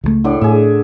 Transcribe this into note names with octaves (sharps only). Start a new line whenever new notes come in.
C#2 F3 A3
A2 D3 D5
A2 G#4 E5